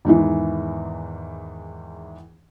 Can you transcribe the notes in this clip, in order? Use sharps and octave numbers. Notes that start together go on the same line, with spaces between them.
E2 G#2 D#3 E3